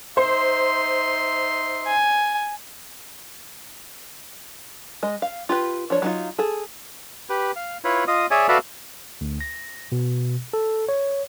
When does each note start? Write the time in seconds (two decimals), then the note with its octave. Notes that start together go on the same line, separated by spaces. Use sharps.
0.17 D#4 C5 E5 C6
1.87 G#5
5.03 G#3 D#5
5.22 F5
5.49 F4 G4 B4
5.90 F3 D4 C#5
6.02 F#3 D#4 F4
6.39 G#4 A4
7.29 G4 B4
7.56 F5
7.84 E4 F4 B4 C#5
8.08 F4 D#5 D#6
8.31 G#4 C#5 D5 E5 G#5
8.48 F#4 A4 B4 D5 E5 F5
9.21 D2
9.41 A#6
9.92 B2
10.53 A4
10.89 C#5